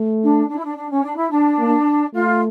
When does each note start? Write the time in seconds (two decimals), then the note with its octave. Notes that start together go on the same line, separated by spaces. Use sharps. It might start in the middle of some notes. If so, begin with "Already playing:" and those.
Already playing: A3
0.22 D4
0.49 D4
0.57 E4
0.63 D4
0.76 D4
0.90 C#4
1.04 D4
1.18 E4
1.30 D4
1.59 A#3
2.14 A3 F4